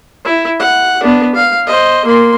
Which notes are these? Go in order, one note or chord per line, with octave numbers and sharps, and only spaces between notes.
E4
F#5
B3 D4
F5
C5 D#5
A#3 C6